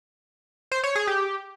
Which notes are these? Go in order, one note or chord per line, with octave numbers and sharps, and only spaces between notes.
C5
C#5
G#4
G4